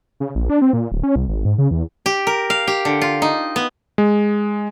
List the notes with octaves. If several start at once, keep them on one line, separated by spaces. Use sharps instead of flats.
C#3
A#1
D4
C4
A#2
D1
C#4
C2
G#1
G#2
C#3
E2
G4
A#4
F5
G4
D3
F4
D#4
B3
G#3